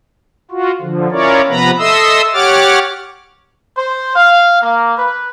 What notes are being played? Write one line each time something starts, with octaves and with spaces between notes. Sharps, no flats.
F4 F#4
D3 F3
C#4 E4 F4 A#4 C#5 D5
C3 F3 B3 B4 A#5 B5
A4 D#5 E5 C6 D#6 E6
G4 C#5 F#5 D6 F6 A6
C5
F5
A#3
B4